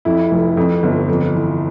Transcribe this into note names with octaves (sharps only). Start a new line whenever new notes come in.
F2 E4
F1
F2
G1
F2
E3